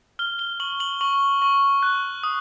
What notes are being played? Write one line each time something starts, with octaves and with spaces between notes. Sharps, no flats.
F6 G7
G7
C#6 F#7
F#7
C#6 F#7
C#6
F#6
D#6